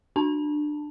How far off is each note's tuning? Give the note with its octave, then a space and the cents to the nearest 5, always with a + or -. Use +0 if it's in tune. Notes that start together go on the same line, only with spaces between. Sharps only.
D4 +20 A5 +0